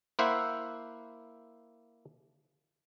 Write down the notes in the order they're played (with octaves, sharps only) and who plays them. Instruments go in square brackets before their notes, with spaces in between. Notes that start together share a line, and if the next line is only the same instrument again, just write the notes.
[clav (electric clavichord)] A#3 E4 C5 E5 F#5